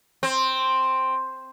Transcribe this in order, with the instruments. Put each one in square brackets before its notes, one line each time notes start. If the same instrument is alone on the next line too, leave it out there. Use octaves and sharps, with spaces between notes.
[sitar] C4